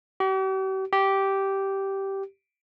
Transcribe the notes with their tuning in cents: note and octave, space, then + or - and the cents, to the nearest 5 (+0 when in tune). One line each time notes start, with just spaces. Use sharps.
G4 -45
G4 -10